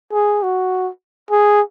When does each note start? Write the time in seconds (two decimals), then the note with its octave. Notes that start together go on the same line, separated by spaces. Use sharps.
0.13 G#4
0.43 F#4
1.31 G#4